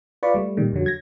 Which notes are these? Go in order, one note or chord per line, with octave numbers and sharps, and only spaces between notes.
F4 B4 D5 B5 C#6
G3 A3
A#2 D#3 G3
F2 D3 F#3
G#6 A#6